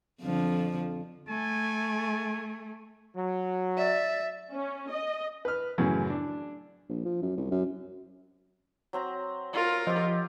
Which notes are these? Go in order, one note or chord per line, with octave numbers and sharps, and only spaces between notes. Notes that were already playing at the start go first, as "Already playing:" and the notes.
F2 D3 F3
A3 G#5
F#3
D5 E5
C#4
D#5
B4 F6
F#2 A2 C#3 E3
D4
A#1
F3
F#2
C2
F#2
F#3 C4 A#5
F4 A#4
F3 C4 G4 D#5